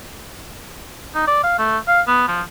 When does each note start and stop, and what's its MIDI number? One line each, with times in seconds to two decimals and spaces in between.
1.15 1.24 63
1.27 1.40 74
1.43 1.58 77
1.58 1.78 57
1.88 2.01 77
2.07 2.25 59
2.27 2.41 53